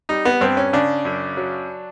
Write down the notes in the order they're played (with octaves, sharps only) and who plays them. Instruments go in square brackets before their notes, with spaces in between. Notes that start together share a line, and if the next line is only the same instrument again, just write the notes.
[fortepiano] G3 D#4
B3
G2 C4
C#4
C#3 D4
F#2
F#3